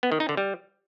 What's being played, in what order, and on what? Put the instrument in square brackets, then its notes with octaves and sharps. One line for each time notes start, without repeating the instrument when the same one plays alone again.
[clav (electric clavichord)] B3
D#3
D#4
D3
G3